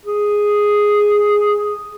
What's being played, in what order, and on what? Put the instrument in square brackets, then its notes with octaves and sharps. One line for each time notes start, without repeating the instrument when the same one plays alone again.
[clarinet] G#4